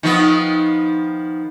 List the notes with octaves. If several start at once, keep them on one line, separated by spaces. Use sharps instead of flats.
D#3 F3 B3